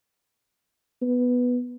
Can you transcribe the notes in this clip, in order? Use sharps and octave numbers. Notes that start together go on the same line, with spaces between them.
B3